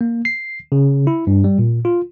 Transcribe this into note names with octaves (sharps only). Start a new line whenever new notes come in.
A#3
C7
C#3
E4
G2
G3
A#2
F4